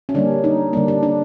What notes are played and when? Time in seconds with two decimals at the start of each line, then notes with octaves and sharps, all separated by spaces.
0.09 C#4
0.14 D3 G3 A#3 D4
0.44 D#4
0.73 D3 G3 A#3 D4
0.88 D4
1.03 D4